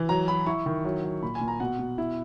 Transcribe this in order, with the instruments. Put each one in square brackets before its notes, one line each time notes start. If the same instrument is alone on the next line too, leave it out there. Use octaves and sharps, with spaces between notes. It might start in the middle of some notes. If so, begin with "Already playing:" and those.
Already playing: [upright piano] E3
F#3 A#5
F#3 B5
E4 C#6
D#3
F#3
F#3
A#2 B5
G#5
A#2
A#5
B2 F#5
B2
E4